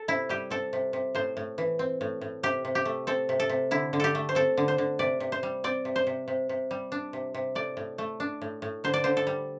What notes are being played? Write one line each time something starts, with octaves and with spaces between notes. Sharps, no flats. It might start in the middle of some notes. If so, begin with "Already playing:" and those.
Already playing: A4
C3 E4
G3 G4
C4 A4
C3
C3
A2 C5
A2
E3
C4
A2
A2
C3 G4
C3
G4
A3
C4 A4
C3
A4
C3
D3 E4
D3
G4 A4
A3
C5
C4 A4
D3
C5
D3
C3 D5
C3
C5
G3
C4 D5
C3
C5
C3
C3
C3
G3
D4
C3
C3
A2 D5
A2
A3
D4
A2
A2
D3 C5
D5
D3 C5
A4
G3